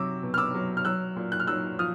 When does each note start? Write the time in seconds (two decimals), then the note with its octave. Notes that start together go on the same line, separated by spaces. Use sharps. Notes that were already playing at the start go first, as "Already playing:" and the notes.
Already playing: C3 F#3 D6 E6
0.23 B2
0.34 F6
0.38 D6 E6
0.54 F#3
0.77 F6
0.85 F#3 E6 F#6
1.16 A#2
1.32 F#6
1.40 F6
1.47 F#3 E6 F#6
1.79 F3 D#6 F6